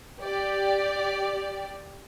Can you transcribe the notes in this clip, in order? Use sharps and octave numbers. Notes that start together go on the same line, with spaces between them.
G4 D5